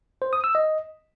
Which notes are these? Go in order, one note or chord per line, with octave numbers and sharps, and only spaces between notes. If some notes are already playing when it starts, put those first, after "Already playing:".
C5
D#6
E6
D#5